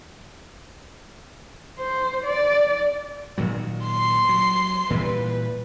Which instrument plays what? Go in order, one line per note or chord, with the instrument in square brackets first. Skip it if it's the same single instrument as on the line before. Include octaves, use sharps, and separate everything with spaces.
[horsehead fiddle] C5
D5
[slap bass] A#2 D#3 F#3
[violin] C6 C7
[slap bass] F#3
[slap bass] A#2 E3 G3 [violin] B4